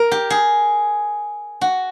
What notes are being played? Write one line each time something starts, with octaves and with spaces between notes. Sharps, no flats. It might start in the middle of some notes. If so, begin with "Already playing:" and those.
Already playing: A#4
G4
G#4
F#4